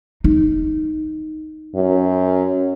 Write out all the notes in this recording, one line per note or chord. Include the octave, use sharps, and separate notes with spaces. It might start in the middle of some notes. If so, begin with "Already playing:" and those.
D#4
F#2